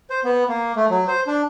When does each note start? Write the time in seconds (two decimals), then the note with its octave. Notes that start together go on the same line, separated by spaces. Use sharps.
0.10 C5
0.25 B3
0.49 A#3
0.76 A3
0.90 F#3
1.08 C5
1.27 D4